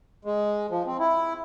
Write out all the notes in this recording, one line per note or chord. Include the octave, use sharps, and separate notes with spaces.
G#3
F3
C4
E4